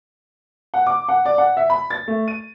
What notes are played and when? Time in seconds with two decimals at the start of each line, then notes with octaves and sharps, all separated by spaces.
0.74 F#5
0.86 D6
1.09 F#5
1.25 D5
1.38 F#5
1.57 E5
1.70 B5
1.90 A6
2.08 A3
2.28 D#7